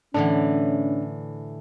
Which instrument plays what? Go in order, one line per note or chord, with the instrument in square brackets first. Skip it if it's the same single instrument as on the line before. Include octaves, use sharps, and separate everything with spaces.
[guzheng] A2 D3 E3 [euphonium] C#4 [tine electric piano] D4